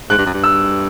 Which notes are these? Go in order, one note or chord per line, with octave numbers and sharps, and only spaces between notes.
G#2 F#6
G2
F#2
G2
E6